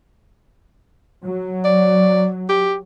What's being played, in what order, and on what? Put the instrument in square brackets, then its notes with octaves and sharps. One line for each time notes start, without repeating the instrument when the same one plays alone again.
[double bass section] F#3
[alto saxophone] D5
G4